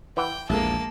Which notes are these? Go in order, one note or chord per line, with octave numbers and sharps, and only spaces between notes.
E3 B4 F#5 G5
A#1 E2 G#3 A#3 G#4 A4 A5